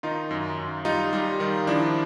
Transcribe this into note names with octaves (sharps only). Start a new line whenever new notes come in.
D#3 D#4 F4
F#2
F#2
G3 D#4 F4
G3
D#3
F3 D4 E4